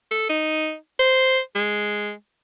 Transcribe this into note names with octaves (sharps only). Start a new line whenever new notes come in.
A4
D#4
C5
G#3